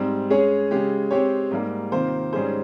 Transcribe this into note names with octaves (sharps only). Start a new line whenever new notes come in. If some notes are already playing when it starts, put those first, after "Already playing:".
Already playing: G#2 G3 C4
G#3 C#4 G#4 C#5
C#3 G#3 C#4 G4
G#3 C4 G4 C#5
G#2 G3 A#3
C3 D#3 A#3 F4 C5
G#2 G3 C#4 G#4 C5